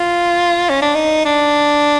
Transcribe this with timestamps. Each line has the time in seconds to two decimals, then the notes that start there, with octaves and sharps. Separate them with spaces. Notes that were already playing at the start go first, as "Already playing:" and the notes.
Already playing: F4
0.70 C#4
0.82 D4
0.95 D#4
1.25 D4